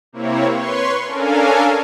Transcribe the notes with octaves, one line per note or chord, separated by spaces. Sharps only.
C3 A#3 C4 E4 C#5
B4 C#5 C6 C#6
C#4 D4 A4 A#4 F5 G#5